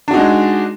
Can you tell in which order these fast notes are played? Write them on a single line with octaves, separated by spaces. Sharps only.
D4 F#4 D#4 G#3